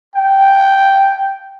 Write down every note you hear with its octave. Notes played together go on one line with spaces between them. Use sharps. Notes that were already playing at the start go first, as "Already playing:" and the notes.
G5